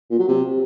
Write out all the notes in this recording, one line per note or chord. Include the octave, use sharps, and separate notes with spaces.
A#2
F#3
C3